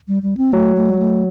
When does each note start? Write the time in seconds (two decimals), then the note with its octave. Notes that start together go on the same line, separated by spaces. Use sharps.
0.08 G3
0.22 G3
0.37 C4
0.52 F#3 A3
0.76 A3
0.90 G3
0.99 A3